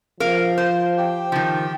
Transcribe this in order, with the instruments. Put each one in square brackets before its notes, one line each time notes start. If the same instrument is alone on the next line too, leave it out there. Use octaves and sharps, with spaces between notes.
[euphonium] F3 [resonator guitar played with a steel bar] A#4 F5
[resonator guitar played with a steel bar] C5
[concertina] G4
[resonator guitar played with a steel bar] D#3 F3